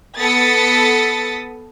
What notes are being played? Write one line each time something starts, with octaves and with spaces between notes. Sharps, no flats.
B3 A4 D#6 A6 B6 C#7